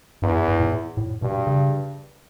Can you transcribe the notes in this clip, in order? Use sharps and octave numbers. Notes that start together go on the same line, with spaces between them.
E2 G2
G2
A2
A2
G2 B2
C#3